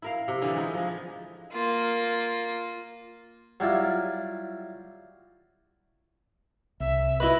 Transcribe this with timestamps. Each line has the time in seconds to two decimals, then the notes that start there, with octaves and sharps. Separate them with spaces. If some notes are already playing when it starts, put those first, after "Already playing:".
0.02 E4 A#4 F5
0.28 C3
0.42 D3 E3 D#4 F4
0.55 G#3 D#4 E4
0.74 F3 G#3
1.52 A#3 F4
3.60 F#3 G3 E4 F4
6.80 C2 E5
7.20 E4 B4 D#5